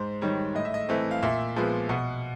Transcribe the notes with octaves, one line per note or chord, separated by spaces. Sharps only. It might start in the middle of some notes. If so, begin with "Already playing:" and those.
Already playing: G#2 C5
D#3 G3 C#5
A2 D#5
E5
D#5
E3 A3 C4
F5
A#2 E5
F3 G#3 B3
B2 F#5